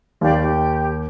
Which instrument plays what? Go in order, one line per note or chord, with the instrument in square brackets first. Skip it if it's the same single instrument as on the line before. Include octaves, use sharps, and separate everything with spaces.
[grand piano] D#2 [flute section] G4 D5 F5
[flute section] G4